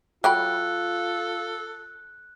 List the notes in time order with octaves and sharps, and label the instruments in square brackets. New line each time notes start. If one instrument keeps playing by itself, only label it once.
[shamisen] F#3 G5 B5 [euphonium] F4 [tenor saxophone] A4 [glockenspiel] F#6